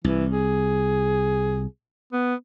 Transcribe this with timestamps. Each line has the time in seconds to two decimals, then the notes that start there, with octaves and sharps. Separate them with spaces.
0.04 C2 E3
0.32 G#4
2.13 B3